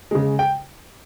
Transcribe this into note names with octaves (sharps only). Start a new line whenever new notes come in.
C#3 G#3
G5